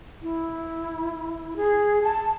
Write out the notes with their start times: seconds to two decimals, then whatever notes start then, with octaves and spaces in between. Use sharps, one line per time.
0.22 E4
1.56 G#4
2.03 A5